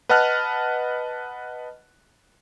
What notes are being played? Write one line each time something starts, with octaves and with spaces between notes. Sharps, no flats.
B4 D#5 F#5 A5 F6 F#6